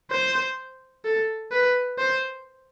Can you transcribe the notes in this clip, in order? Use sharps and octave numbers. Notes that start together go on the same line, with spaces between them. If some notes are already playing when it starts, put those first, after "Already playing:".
C5
A4
B4
C5